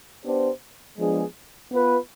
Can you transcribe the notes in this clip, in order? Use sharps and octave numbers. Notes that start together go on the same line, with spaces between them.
B3 D4 G4 C5
F3 G#3 B3 D4 G#4
B3 F4 B4